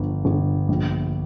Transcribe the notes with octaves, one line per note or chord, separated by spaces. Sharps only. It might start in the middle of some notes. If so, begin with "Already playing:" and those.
Already playing: G1 F3
G1
A#1